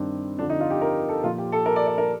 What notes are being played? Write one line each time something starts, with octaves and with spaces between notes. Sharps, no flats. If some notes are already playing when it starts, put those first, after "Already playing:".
Already playing: G2 D#3 G3 C4 D4
F2 D3 F3 D4
D#4
F4
G4
A#4
A4
A#2 F3 F4
G4
A4
A#4
D5
D5
A#4